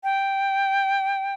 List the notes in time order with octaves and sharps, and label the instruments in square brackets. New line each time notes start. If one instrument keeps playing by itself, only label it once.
[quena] G5